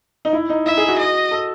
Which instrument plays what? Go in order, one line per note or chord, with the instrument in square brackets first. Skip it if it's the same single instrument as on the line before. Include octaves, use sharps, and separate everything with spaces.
[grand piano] D#4
E4
D#4
[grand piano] E4 [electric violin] E5
[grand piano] G#4
F#4
[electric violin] D#5
[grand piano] A4